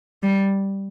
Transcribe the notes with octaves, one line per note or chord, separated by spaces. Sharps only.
G3